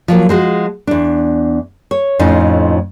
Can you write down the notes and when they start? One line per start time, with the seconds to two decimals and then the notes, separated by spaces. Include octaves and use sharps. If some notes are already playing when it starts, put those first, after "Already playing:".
0.08 F3 F#3 A#3
0.29 F3 G#3 F#4
0.87 E2 D4
1.91 C#5
2.19 F2 A2 F3 C#4 D#4